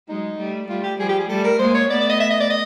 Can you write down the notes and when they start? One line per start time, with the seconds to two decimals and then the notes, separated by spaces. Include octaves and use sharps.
0.08 F#3 G#3 D#4
0.38 G3 A3
0.68 G3 A3 F4
0.83 G4
0.99 F3 G3 G#4
1.09 G4
1.19 G#4
1.29 G3 A3 A4
1.44 A#4
1.59 G#3 A#3 C5
1.74 C#5
1.90 A3 B3 D5
2.00 D5
2.09 D#5
2.20 E5
2.30 D#5
2.40 D5
2.50 D#5